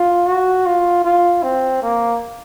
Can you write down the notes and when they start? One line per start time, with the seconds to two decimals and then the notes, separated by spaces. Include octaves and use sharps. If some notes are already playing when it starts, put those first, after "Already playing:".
Already playing: F4
0.27 F#4
0.66 F4
1.05 F4
1.43 C4
1.82 A#3